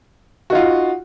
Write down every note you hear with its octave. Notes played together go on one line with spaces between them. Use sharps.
D#4 F4 F#4